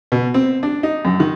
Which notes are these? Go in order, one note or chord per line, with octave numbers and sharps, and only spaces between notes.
B2
C4
D4
D#4
F#2
D#3